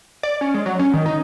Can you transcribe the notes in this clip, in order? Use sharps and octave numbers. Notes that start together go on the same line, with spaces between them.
D5
C#4
G#3
F#3
C#4
D#3
D#4